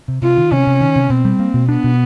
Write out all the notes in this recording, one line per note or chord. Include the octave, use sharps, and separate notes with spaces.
C3
C3 F4
D#3
C3 C#4
C3
D#3
C3
B2 C4
G3
A#3
B2
B3 D4
B2